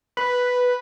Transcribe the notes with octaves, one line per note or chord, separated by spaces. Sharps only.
B4